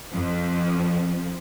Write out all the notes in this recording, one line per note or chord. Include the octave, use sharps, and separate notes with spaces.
F2 F3